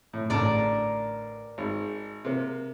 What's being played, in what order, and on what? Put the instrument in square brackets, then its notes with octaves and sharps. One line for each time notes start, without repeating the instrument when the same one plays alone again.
[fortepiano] A2
[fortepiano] A1 D3 A5 [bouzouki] A#4 D5
[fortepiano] G#1
C3 A#3